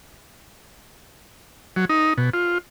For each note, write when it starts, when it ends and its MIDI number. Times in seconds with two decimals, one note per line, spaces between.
1.76 1.85 54
1.89 2.13 63
2.18 2.30 47
2.34 2.58 65